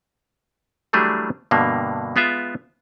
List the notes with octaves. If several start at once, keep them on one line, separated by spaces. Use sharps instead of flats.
E3 F#3 G3 A3 D4 G#4
G2 B2 D3 A#3
G#3 B3 F4 E5